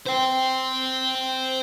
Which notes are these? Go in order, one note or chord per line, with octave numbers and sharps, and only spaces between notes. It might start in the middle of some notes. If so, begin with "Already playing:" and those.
C5 G5